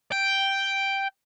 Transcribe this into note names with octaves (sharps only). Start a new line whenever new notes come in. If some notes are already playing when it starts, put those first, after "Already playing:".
G5